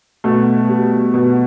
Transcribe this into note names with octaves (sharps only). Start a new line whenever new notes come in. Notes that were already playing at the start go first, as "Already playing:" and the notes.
B2 A3
G3
B2